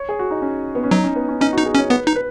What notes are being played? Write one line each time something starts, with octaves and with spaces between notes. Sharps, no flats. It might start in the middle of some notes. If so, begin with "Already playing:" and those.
Already playing: C#5
G#4
F#4
D#4
C#4
B3
C#4
F#3 D#4
C#4
B3
C#4
C#4 D#4
D#4 F#4
G#4
C#4
C#5
B3 B4
D#4
B4